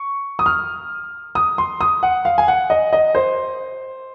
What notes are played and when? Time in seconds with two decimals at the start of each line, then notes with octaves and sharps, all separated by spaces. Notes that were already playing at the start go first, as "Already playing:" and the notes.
Already playing: C#6
0.39 D#6
0.46 F6
1.35 D#6
1.58 C6
1.81 D#6
2.03 F#5
2.25 F5
2.38 G#5
2.48 F#5
2.70 D#5
2.93 D#5
3.15 C5